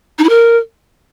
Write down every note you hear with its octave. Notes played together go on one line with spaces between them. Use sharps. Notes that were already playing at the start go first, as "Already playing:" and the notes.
D#4
E4
A#4